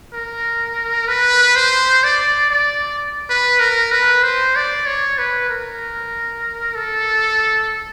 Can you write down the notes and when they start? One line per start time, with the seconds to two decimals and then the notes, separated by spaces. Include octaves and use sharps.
0.13 A#4
1.08 B4
1.56 C5
2.04 D5
2.51 D5
3.30 B4
3.60 A#4
3.92 B4
4.23 C5
4.56 D5
4.86 C#5
5.18 B4
5.49 A#4
6.76 A4